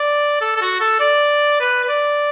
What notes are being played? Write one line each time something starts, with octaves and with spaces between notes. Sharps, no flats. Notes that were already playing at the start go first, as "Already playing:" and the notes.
Already playing: D5
A4
A4
F#4
A4
D5
B4
B4
D5